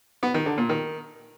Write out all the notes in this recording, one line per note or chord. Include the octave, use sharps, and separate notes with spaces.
B3
D#3
D3
A#2
D#3